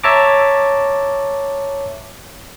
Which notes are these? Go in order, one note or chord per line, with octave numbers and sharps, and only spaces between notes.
C#5 E5 A5 A#5 D6